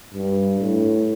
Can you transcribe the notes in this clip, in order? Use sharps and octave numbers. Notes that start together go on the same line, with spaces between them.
G2
A2